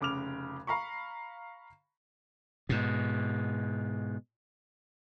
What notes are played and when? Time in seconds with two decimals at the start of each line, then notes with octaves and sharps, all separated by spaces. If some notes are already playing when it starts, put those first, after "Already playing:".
0.01 F1 C#3 D6 F6 F7
0.67 F5 A#5 B5 C#6
2.69 G#2 B2